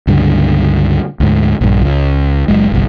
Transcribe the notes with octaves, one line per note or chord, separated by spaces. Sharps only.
C#2 G2 D3
D2 G#2
A#1 G2
C#2
F#1 F#2 G#3
G1 C2